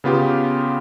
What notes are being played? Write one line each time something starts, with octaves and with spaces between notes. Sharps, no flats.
C#3 B3 F4 G4